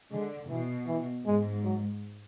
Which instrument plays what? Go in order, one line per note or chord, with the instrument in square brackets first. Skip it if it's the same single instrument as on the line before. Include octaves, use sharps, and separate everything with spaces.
[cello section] D3 [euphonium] G#3
[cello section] B2 [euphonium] E3
[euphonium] E3
[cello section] G#2 [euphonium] G#3
[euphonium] F#3